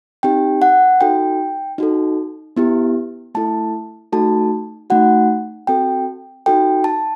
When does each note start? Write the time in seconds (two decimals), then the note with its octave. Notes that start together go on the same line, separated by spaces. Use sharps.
0.23 C4 D#4 G4 G5
0.62 F#5
1.01 D#4 F#4 A4 G5
1.78 D#4 F#4 A4
2.57 B3 E4 G4
3.35 A3 E4 A4 A5
4.13 A3 D#4 F#4 A4 A5
4.90 A3 D#4 F#4 F#5
5.67 C4 F#4 A4 G5
6.46 D#4 F#4 A4 G5
6.84 A5